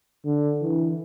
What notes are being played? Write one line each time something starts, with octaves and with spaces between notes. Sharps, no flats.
D3
E3